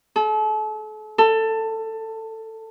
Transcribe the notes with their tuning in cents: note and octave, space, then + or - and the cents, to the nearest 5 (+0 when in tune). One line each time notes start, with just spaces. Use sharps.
A4 -40
A4 +15